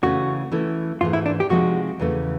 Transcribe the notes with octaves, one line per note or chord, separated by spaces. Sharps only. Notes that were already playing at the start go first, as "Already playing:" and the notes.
C#3 E3 A3 C#4 F#4
E3 A3 C#4 E4 A4
G#2 E3 A3 F4
E4
D4
G4
C3 F3 G#3 C4 D#4 F#4
E2 C#3 E3 A3